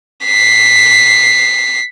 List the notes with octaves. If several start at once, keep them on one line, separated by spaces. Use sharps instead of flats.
B6 C7